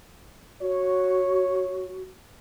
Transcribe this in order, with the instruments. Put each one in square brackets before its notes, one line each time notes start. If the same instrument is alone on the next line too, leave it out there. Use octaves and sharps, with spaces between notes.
[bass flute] F#4 [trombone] C#5